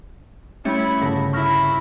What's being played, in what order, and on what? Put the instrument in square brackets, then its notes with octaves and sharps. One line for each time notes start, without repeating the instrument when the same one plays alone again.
[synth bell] G3 A3 C#4 [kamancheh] E4 [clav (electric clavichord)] G4 C#5 E5
[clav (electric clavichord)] G1 C#3 B3 [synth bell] A5 A#6
[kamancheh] E4 [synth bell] C#6 F6 A#6